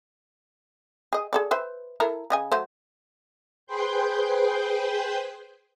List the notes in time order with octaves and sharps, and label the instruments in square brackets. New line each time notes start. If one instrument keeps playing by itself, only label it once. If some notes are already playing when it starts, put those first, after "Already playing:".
[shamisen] G#4 D#5
G#4 A4 D5
B4 C5 E5
E4 A4 A#4
C#3 D#5 G#5
F#3 A3 C5
[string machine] G#4 B4 C5 G5 C6 G6